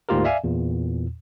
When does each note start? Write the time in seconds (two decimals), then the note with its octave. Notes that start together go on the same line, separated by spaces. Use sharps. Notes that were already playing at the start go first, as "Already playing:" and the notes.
0.09 D2 G#2 A#3 F4 G4 A#4
0.24 D5 E5 F5 G#5
0.44 E2 A#2